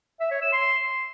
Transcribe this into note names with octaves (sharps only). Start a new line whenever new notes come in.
E5
C#5
E6
C6